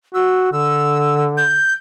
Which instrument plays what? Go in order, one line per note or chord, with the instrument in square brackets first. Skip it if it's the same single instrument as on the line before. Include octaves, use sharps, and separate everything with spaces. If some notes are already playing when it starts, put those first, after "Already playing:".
[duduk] F#4 [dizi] E6
[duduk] D3 [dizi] E6
[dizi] G6